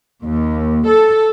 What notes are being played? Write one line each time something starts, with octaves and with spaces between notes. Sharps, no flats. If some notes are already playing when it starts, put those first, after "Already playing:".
D#2
A4